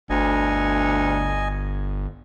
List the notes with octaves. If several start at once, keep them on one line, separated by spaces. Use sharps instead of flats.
G1 D2 D#5 G#5